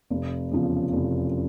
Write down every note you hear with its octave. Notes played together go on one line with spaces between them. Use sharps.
F1
E2 C#3 F3
F1